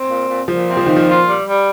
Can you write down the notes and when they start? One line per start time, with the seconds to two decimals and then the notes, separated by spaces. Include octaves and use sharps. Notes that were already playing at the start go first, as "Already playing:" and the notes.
Already playing: C4
0.09 A#2
0.28 A#2
0.47 A#2 F3
0.68 C4
0.77 F3
0.86 A#2 D#3
0.96 F3
1.06 F4
1.25 G3
1.44 G3